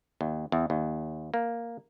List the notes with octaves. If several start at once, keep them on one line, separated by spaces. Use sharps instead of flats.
D#2
E2
D#2
A#3